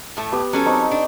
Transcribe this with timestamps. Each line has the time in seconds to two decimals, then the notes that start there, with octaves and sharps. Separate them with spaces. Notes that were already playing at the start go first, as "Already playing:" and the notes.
0.17 A2 A3
0.32 B3 G4
0.53 F#3 C#4 A4
0.65 C4 D#4 C#6
0.91 D4